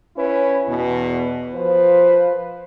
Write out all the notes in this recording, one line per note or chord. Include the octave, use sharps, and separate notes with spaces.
C#4 E4 B4
E2 B2
F3 F4 B4 C5